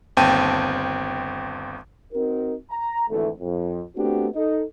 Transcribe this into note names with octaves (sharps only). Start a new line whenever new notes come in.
G1 D#2 C4 G5 A5 D#7
C4 D#4 F#4 A#4
A#5
G#1 D2 E3 A3
F2
A3 B3 C4 D4 F#4 G4
D#4 A4 D#5